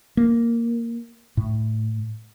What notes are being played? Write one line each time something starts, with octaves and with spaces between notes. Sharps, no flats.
A#3
A2